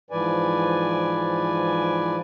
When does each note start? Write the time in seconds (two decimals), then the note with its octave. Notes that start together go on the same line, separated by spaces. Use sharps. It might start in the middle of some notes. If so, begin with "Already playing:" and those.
0.11 G#2 E3 F3 B4 D5 G#5